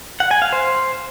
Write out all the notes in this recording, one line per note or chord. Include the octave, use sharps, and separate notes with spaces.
F#5
G#5
F5
C5